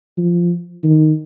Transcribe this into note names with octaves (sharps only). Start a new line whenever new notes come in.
F3
D#3